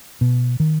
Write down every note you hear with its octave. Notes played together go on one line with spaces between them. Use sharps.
B2
D#3